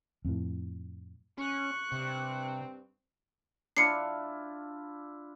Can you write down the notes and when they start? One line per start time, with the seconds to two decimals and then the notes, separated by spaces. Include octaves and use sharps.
0.25 F2 A2
1.38 C#4 C#6 F#6
1.92 G2 C3 C4
3.77 D4 E4 F4 C7 C#7